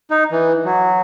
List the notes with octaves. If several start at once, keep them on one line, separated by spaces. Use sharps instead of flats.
D#4
E3
F#3